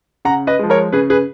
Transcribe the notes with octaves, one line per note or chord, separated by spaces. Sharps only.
C#3 F#5 A#5
B4 D#5
F3 G#3
A#4 C#5
C#3 G#4 B4
G#4 B4